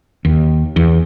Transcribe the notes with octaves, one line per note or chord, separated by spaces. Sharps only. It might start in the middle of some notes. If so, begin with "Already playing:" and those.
D#2
E2